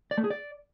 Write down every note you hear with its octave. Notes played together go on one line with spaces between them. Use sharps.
D5
A3
G#4
D5